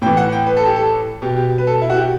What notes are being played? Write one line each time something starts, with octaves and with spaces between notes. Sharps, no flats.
A2 E3 G5
F#5
G5
B4
A4
G4
A4
B2 G4
G4
B4
A4
E4
F#4
G4